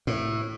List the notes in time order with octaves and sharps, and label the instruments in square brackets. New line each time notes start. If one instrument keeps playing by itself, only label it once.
[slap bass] A2